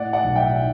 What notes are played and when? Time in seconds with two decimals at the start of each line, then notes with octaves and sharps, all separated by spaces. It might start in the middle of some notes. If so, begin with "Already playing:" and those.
Already playing: A2 D5 F#5
0.13 D5 F#5
0.24 B1
0.36 E5 G5